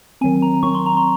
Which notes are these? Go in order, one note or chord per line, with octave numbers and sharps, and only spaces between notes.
D#3 F#3 C4 G#5
A#5
D#3 F#3 C4 C#6
C6
A#5
C6